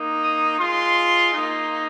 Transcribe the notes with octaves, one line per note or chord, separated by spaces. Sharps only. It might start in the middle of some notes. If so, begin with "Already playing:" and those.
Already playing: A#3 D#4
D#6
G#3 F4 C6
A#3 D#4